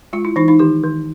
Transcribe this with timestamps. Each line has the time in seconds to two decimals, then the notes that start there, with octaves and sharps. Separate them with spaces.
0.13 G#3 F4
0.25 E4
0.36 E3 D#4
0.48 D#4
0.59 D#3 G4
0.83 D#3